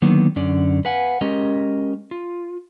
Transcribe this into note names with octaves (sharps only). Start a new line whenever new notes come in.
D3 D#3 F#3 A#3 B3
F#2 D3 C#4 D5
B4 F5 F#5 G#5
G#3 C#4 G4 A#4 D#5
F4